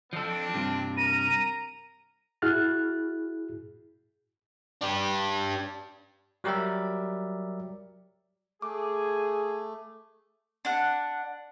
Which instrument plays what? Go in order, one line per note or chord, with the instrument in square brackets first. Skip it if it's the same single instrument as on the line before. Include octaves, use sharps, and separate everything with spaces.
[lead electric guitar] F3 A4 [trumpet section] C4 D4 D5
[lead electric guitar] G2 C3
[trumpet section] A#4 A#5 [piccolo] D#7
[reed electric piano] E4 F#4 G#4 F6 F#6 A6
[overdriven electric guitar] D4 G4
[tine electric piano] F#3 G3 G4 A#4 D5 E5
[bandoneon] A3 [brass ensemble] G#4 [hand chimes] D6
[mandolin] D4 F#5